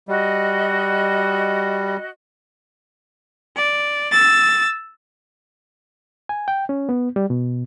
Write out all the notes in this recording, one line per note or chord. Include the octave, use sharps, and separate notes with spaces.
G3 F#4 D#5
D5
E6 A6
G#5
G5
C#4
B3
G3
B2